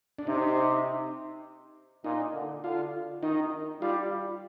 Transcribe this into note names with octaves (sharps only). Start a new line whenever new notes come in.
D4
C3 D#4
A#2 D#4
D3
D3 F4
D#3 D#4
G3 F4